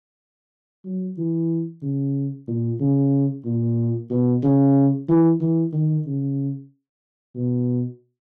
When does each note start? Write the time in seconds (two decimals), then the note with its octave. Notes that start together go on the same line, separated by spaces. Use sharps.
0.85 F#3
1.17 E3
1.82 C#3
2.48 A#2
2.80 C#3
3.45 A#2
4.10 B2
4.43 C#3
5.09 E3
5.41 E3
5.73 D#3
6.06 C#3
7.35 B2